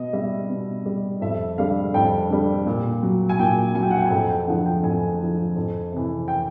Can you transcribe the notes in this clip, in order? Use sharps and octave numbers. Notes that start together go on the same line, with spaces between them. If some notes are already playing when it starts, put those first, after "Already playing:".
Already playing: B2 D#5
G3 E5
B2
G3
F2 E5
D3 G3 F5
F2 G5
D3 G3
A#2
F#3
G#5
A#2 G5
F#3 G#5
G5
F#5
G5
G#5
F2 G5
G5
D3 F3 F#5
G5
F2 G#5
D3 F3
F2
C3 E3
G5